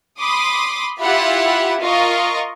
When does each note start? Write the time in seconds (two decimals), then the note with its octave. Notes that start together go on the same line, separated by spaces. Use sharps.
0.19 B5 C6 D6 D#6
1.00 E4 F4 G4 E5 F#5 B5
1.81 F4 A#4 D#5 C#6